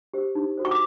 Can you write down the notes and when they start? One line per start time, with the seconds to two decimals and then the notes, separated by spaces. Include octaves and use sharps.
0.14 G4 C5
0.35 D#4
0.57 F#4 A4 C5
0.65 C#6
0.71 D6